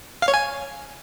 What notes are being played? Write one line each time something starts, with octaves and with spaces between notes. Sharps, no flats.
F5
C#5
G#5